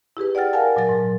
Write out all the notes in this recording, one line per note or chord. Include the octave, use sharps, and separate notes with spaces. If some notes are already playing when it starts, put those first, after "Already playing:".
E4 G4 G#4 B4
D5 F#5 G5 F6 A6
A#4 F5 F#5 G#5 A5
A#2 F#3 A#4 A6
G#2